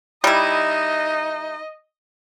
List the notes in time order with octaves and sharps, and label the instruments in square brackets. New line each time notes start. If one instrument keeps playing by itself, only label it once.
[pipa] G3 E4 [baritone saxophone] D#4 [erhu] D#5